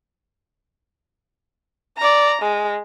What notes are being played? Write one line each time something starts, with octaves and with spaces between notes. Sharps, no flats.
D5 A#5
G#3